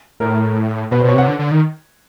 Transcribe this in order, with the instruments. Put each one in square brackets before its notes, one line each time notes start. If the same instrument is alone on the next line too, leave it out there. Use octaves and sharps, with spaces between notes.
[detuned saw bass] A2 [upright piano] A#4
[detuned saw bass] B2 [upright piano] B4
[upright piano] C5
[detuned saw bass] B2 [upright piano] C#5
[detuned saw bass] C3 [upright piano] F#5
[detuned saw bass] D3
D3
D#3